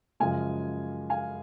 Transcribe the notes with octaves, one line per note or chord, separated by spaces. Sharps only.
F#2 C#3 F3 G#3 F5 G#5
F5 G#5